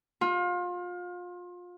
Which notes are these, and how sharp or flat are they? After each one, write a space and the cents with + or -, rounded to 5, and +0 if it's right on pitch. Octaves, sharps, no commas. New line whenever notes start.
F4 +30